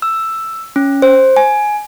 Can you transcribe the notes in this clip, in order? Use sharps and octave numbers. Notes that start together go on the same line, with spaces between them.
E6
C#4
C5
G#5